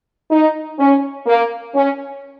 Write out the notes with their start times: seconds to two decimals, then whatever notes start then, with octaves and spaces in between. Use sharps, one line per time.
0.31 D#4
0.79 C#4
1.27 A#3
1.75 C#4